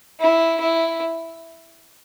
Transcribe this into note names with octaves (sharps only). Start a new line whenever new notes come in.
E4
E4